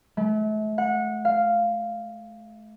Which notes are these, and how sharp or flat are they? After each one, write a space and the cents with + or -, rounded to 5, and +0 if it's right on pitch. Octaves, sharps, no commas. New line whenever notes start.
A3 -40
F#5 -25
F5 -5